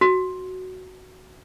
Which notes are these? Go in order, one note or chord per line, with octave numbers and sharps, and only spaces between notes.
F#4